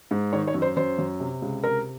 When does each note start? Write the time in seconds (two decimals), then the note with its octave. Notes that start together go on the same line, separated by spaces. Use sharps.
0.11 G#2
0.32 D#3 C#5
0.47 C#5
0.55 F#2
0.62 C5
0.77 F#2 C5
0.98 F#2
1.20 C3
1.42 C#2
1.63 C3 A#4